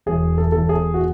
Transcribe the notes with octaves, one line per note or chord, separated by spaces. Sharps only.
E1 G#4
A4
E2 A4
G#4
F#4